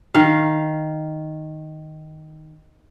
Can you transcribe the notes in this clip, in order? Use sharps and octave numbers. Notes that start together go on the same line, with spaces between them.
D#3 F5